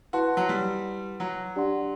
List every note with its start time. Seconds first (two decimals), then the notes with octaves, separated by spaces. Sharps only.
0.13 E4 F#4 B4 F#5 A5 C6
0.37 F#3
0.49 G3
1.20 F#3
1.56 D4 G4 D5 F#5 C6